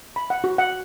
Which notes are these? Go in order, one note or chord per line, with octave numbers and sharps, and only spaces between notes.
B5
F#5
F#4
F#5